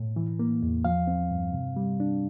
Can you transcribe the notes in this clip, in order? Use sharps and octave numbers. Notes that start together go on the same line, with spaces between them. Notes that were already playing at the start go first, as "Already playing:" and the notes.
Already playing: A2
E3
A#3
E2
F3 F5
C4
G2
C3
G3
D4